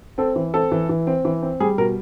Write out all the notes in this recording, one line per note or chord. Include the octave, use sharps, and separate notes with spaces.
C4 A4
E3
C4 A4
E3
E3
C4
E3
C4
G3 G#4
B2 A#4